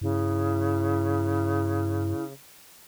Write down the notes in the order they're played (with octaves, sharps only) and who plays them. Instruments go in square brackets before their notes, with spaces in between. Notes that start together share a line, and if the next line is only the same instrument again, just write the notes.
[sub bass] G2 [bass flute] C#3 [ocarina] E4